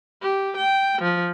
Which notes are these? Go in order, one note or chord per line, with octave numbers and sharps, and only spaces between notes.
G4
G5
F3